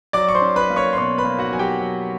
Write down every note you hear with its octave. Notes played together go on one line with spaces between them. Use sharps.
F#3 D5 D6
C#6
C5 C6
C#4
B4 B5
A#3
C#5 C#6
C6
B2 C#5 C#6
B4 B5
A#3
F#4 F#5
F#3 G#5
G4 G5
F#3